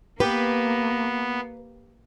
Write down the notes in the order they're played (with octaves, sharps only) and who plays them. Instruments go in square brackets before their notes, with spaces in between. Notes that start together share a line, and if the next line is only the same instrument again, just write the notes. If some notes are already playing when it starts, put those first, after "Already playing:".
[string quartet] A#3 [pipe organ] B3 [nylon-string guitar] G4 [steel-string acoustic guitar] B4